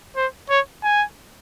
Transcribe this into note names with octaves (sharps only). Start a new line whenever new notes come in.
C5
C#5
G#5